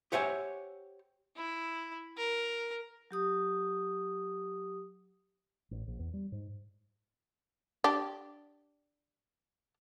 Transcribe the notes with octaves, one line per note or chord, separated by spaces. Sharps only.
G4 C5 C#5 E5 F#5 G#5
E4
A#4
F#3 G4 D#6
A1
A#1
E2
G3
G#2
D4 G4